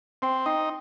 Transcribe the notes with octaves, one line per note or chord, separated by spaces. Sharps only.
C4 G5
D#4 G5